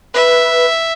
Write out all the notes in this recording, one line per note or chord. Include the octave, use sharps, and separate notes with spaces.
B4 E5